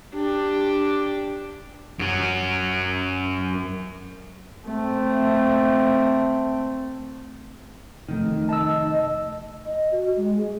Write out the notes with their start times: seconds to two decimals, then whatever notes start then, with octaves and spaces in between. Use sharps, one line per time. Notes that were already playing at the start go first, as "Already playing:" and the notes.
0.14 D4 G4
1.99 F#2 F#3
4.66 A3 C4
8.08 F1 D#3 A3
8.49 D#5 A5 E6
9.66 D#5
9.92 F#4
10.17 G#3
10.38 G#4